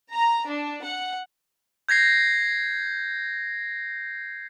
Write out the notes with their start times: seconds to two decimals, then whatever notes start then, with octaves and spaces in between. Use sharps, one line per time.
0.13 A#5
0.49 D4
0.81 F#5
1.89 G6 G#6 A#6 C7